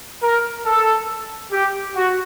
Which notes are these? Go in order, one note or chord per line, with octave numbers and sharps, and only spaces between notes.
A#4
A4
G4
F#4